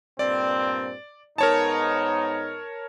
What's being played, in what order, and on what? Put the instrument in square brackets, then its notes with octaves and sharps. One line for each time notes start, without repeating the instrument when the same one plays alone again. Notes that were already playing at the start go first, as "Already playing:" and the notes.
[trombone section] G2 A#2 C4 [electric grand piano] D5
[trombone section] G#2 B3 D#4 [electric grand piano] A#4 C#5 A5